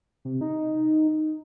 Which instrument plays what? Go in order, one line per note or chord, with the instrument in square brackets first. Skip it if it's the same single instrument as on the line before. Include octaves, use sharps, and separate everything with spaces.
[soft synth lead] C3
D#4